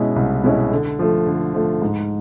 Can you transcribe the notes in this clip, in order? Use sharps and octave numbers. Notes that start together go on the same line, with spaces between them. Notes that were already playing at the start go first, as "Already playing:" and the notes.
Already playing: B2 G#3 C#4 E4
C2
B2 G#3 C#4 E4
D3
F3 A3
D3
F3 A3
G#2